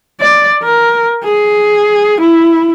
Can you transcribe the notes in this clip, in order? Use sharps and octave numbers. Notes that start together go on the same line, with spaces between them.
D5
A#4
G#4
E4